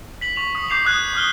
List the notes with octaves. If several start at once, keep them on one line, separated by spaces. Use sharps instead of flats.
B6 F#7
C#6 B6 F7
D#6
D6 G6 C7 F7 F#7
D6 D#6 F#6 G#6
C#6 D#6 F6 G7